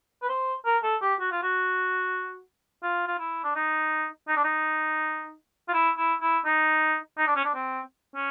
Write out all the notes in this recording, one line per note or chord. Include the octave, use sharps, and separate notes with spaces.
B4
C5
A#4
A4
G4
F#4
F4
F#4
F4
F4
E4
D4
D#4
D#4
D4
D#4
F4
E4
E4
E4
D#4
D#4
D4
C#4
D4
C4
C#4